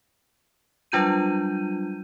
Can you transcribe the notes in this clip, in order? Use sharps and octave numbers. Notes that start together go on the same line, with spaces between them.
F#3 G3 D4 F4 G6 D#7